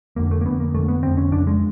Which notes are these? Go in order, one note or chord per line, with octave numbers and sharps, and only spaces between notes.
F2 D3 A#3
A3
A#3
F2 D3 B3
A#3
F2 D3 A3
B3
F2 D3 C4
C#4
F2 C#3 D4
G#3